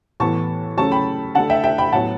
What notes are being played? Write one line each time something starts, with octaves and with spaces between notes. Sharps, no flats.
A2 E3 B3 A5 C#6
C#3 F#3 A3 A5 C#6
G5 B5
D3 A3 F#5 A5
E5 G5
E5 G5
G5 B5
A2 F#3 B3 F#5 A5